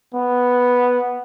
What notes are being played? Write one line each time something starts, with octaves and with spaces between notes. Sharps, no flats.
B3